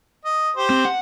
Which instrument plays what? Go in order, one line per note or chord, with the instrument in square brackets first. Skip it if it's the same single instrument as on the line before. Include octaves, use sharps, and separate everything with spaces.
[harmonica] D#5
G4 C5
[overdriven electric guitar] C4
F#5